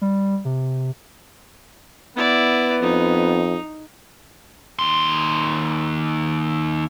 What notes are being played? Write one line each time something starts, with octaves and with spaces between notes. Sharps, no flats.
G3
C3
B3 E4 D5
F2 D#4
D#2 C6